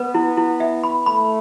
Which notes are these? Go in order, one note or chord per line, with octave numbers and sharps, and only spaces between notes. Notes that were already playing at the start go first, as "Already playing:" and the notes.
Already playing: B3 B4
E4
E4
E5
B5
A3 B5